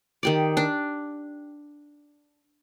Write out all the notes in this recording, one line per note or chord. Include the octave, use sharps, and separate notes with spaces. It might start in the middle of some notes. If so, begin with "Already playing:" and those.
D#3 G4 D5
D4